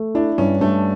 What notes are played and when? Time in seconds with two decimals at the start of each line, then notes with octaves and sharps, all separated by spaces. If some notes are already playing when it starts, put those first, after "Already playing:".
Already playing: A3
0.15 D4 E4
0.38 G2 C#4
0.61 G2 A3